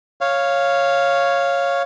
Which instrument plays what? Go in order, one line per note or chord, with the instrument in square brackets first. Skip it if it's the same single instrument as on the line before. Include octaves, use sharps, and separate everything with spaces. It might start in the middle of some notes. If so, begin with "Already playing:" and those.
[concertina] C#5 F5